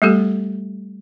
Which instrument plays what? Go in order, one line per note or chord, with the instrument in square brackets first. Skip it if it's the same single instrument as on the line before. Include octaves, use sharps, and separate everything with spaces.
[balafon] G3 A3 B3 G4 A4